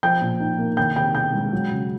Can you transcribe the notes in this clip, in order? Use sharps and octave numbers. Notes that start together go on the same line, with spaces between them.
F3 G5 G6
A#2
D#4
A#3
D#3 G5 G6
C3 G5 G6
B3 G5 G6
G#3
F#3
C#3